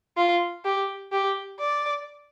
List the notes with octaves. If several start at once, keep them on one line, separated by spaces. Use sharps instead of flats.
F4
G4
G4
D5